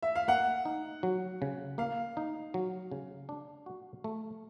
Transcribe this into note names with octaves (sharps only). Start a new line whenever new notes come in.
E5
F5
A#3 F#5
D#4
F#3
C#3
A#3 F5
D#4
F#3
C#3
D4
F#4
A3